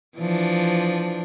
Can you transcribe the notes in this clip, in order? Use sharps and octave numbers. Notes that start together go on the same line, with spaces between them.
E3 F3 D4